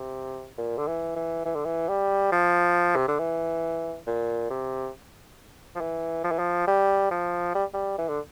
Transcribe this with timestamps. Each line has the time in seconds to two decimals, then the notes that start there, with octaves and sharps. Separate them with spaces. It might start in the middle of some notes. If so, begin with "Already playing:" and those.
Already playing: C3
0.58 A#2
0.78 D3
0.87 E3
1.16 E3
1.45 E3
1.55 D3
1.65 E3
1.89 G3
2.32 F3
2.96 C3
3.08 D3
3.19 E3
4.07 A#2
4.50 C3
5.76 F3
5.81 E3
6.24 F3
6.31 E3
6.39 F3
6.67 G3
7.11 F3
7.55 G3
7.74 G3
7.98 E3
8.09 D3